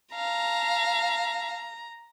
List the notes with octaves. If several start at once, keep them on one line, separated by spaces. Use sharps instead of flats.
F5 A5 A#5